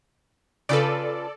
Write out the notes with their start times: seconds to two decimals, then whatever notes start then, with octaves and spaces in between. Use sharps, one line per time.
0.69 C#3 F4 A4 B4 D5